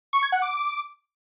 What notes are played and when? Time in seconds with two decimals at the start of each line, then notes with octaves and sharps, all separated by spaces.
0.13 C#6
0.23 G#6
0.32 F#5
0.42 D6